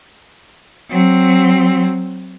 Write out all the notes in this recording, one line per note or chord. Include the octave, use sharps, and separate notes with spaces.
F#3 C4